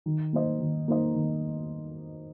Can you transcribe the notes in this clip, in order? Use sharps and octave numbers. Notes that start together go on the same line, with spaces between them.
D#3
A#3 D#4 C5 D#5
D#3
A#3 D#4 C5 D#5
D#3